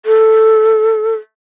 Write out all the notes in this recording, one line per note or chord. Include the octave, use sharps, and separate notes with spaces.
A4